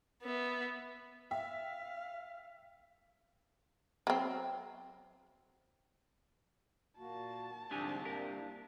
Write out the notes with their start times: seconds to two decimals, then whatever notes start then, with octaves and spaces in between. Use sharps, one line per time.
0.23 B3 E5
1.31 E5 F5 G5
4.07 F#3 C4
6.98 A#2 A#3 F#4 A5
7.71 C2 G#2 D3 F3 D4 G4 G#5
8.05 A#3 D4 G4 A#4